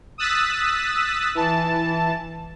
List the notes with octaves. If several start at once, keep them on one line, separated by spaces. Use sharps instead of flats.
D#6 E6 F#6 A6 B6
E3 A5